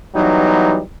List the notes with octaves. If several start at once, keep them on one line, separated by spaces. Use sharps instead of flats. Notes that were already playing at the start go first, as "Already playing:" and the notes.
E3 F#3 G3 B3 D#4